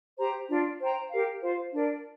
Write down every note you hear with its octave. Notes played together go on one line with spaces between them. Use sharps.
G4 C5 A#5
D4 F4 D5
C5 G5 A#5
G4 A#4 F5
F4 C5 F5
D4 A#4 D5